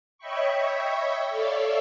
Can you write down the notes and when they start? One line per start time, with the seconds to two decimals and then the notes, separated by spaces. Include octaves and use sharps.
0.18 C#5 D#5 E5 G5 B5 C#6
1.29 A4 C#5 D5 E5 F5